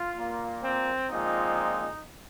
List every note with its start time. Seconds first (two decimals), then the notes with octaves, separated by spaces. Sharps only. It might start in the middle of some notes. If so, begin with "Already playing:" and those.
Already playing: F4
0.14 A#2 A#3
0.62 C4
1.10 A#2 F3 G#3 C4 D#4